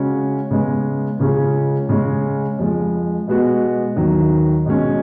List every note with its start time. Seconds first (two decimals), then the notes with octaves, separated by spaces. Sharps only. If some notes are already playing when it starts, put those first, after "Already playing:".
Already playing: C#3 G#3 C#4 F#4
0.51 C#3 G#3 B3
1.20 C#2 C#3 G#3 C#4 G#4
1.89 C#3 G#3 C#4
2.59 F2 F3 G#3
3.27 B2 G#3 B3 F#4
3.96 D#2 D#3 F#3
4.66 B2 G#3 C#4